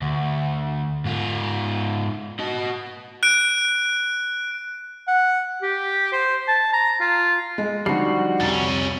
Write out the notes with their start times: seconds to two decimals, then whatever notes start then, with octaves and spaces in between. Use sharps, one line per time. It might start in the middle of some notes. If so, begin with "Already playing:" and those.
0.02 D2
1.05 G#2 F4
2.39 F#4 D#5
3.23 F#6 D7
5.08 F#5
5.62 G4
6.12 C5
6.48 A5
6.73 A#5
7.01 F4
7.58 G#3
7.86 D3 F3 G3 D#4 F#4 C7
8.40 F1 C2 F2 C#4 A#5 A6